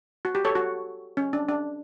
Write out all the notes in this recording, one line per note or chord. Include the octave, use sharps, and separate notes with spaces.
F#4
G4
A4 C#5
F#4
C#4
D4
D4